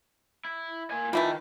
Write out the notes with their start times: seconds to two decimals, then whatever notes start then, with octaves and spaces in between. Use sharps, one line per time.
0.45 E4
0.91 A#3 G#5
1.13 D#3 E3 A3 A#3 D#4 F4